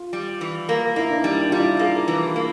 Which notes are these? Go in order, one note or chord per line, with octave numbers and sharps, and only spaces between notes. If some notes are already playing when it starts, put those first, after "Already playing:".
Already playing: F4
G3
E3
A#3
A#3 E4
D4
D#4
G3
D4
G3 F4
E4
A#3 G#4
E3
A#3